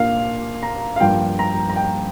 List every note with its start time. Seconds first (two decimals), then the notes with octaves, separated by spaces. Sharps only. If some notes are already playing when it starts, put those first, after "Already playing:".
Already playing: A#2 A#3 D4 F5
0.63 A#5
0.96 F5
1.00 G2 F3 A#3 G5
1.39 A#5
1.70 A#5
1.76 G5